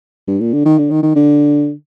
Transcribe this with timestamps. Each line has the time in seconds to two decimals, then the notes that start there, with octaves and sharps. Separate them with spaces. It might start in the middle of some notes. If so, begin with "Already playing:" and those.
0.28 G2
0.40 A#2
0.53 D3
0.65 D#3
0.78 D3
0.91 D#3
1.03 D#3
1.15 D3